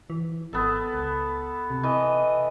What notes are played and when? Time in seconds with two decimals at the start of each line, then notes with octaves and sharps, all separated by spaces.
0.10 E3
0.53 G#1 B3 A4
0.94 C#2
1.70 C3
1.83 E3 D#5